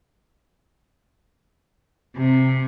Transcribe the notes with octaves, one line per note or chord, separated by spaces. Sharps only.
C3